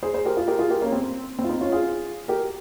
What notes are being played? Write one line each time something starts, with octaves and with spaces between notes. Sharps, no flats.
G#4 C5
G#4 C5
G4 A#4
F4 G#4
G4 A#4
F4 G#4
G4 A#4
A#3 C#4
C4
C4
F4
C4 D#4
C#4 F4
F4 G#4
G4 A#4